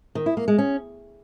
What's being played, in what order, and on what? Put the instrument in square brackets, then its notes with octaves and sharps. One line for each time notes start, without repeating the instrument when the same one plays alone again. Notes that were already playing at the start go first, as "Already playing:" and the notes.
[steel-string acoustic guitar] D#3
E4
A#3
G#3
C#4